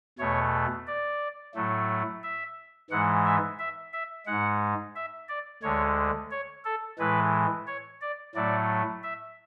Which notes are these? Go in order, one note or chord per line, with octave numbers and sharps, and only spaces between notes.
E2 B2 A3 C#5
D5
A2 F#3 A3
E5
G#2 E3 G#3 F#5
E5
E5
E5
G#2 G#3 F#5
E5
D5
D2 D3 G#3 C#5
C#5
A4
A2 E3 G#3 B4
C#5
D5
A2 F#3 A3 D5
E5